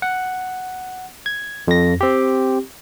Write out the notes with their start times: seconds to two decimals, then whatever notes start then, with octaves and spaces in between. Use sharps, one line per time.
0.02 F#5
1.26 G#6
1.68 F2 A#6
2.01 C4 G4